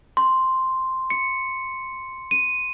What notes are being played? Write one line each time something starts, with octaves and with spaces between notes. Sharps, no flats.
C6
C#7
D#7